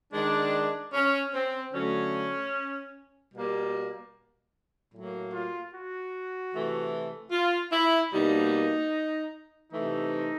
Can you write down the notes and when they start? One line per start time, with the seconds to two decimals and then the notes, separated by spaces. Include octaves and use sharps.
0.13 D#3 G#3 D4
0.94 C#4
1.34 C4
1.74 D3 F#3 A3 C#4
3.33 B2 G3 A#3
4.93 A2 F#3 A#3
5.33 F4
5.73 F#4
6.53 C3 E3 A3
7.32 F4
7.72 E4
8.12 B2 G3 A#3 D#4
9.72 C3 E3 A3 D#4